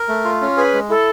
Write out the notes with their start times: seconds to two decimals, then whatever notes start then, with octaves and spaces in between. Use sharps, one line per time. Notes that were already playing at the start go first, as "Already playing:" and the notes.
Already playing: A#4
0.08 A3
0.25 F4
0.41 C#4
0.57 G#4 B4
0.74 G#3
0.89 E4 A4